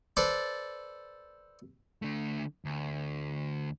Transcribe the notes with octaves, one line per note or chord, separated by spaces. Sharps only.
A4 B4 C5 D5
D3 A3
D2